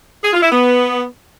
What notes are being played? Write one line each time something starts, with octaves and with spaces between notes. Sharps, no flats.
G#4
F4
E4
B3